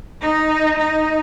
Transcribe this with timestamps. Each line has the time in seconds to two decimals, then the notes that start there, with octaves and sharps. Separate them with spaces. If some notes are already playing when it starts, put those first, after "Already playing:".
0.21 D#4
0.78 D#4